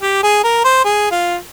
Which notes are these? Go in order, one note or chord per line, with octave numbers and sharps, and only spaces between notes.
G4
G#4
A#4
C5
G#4
F4